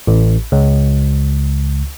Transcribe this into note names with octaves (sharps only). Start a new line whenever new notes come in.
A1
C#2